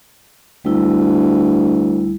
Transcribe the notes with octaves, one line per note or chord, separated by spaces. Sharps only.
D2 G3 E4